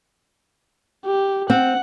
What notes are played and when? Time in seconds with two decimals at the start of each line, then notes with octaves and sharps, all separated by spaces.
1.05 G4
1.50 C4 F#5